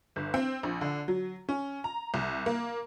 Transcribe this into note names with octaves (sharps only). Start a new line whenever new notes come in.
G1
C4
A#1
D3
F#3
C#4
A#5
C2
A#3